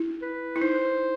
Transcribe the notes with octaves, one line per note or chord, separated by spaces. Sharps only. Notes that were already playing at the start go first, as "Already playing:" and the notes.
Already playing: E4
B4
E4
D#4 C5